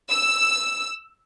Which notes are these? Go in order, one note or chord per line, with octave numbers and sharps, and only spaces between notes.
E6